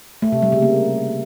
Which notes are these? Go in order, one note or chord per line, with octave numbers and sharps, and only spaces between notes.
A3
C3
G3
C#3
A#3